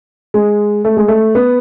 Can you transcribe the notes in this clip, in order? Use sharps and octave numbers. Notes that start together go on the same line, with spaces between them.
G#3
A3
G#3
A3
B3